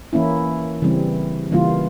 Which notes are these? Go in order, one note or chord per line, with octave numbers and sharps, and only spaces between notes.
E3 A#3 C#4 E4
C#3 E3 G3 C4
C#3 E3 G3 A#3 F4